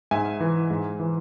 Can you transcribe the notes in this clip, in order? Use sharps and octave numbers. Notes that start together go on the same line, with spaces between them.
G#2 E5 G#5
E3
G#2
E3